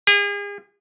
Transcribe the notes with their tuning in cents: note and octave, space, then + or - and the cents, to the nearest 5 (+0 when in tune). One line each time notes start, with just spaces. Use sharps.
G#4 -40